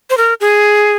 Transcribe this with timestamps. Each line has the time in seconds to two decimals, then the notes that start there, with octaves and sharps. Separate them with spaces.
0.10 C5
0.17 A#4
0.41 G#4